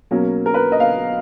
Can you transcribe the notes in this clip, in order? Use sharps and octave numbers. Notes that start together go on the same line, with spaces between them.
B2 F#3 A#3 C#4
A#4
B4
D#5
F5